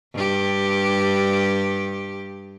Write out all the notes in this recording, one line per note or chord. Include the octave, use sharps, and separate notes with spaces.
G2 G4